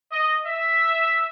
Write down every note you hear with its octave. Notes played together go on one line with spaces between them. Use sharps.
D#5
E5